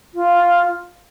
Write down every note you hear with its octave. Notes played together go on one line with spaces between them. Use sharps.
F4